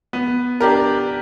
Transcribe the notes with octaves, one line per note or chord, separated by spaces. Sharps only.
B3
D4 G4 A#4